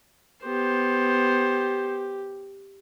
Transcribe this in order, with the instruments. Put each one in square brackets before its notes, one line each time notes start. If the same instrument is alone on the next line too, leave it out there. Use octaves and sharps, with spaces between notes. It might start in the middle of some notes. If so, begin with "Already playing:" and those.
[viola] B3 C5 [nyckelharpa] G4